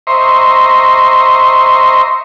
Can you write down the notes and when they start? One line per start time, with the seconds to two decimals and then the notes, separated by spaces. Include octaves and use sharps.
0.07 C5 D#5 E5 A#5 C6 C#6